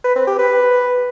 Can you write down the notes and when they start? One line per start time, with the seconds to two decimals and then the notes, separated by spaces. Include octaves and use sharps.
0.04 B4
0.16 C4
0.27 G4
0.38 B4